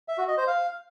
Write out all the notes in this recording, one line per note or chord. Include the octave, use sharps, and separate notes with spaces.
E5
F#4
D#5
C5
F5